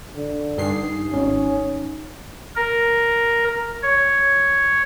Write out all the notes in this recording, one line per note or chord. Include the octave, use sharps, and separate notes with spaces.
D3
G2 D#4 G#5 C7
G#1 C#4 D#4
A#4
C#5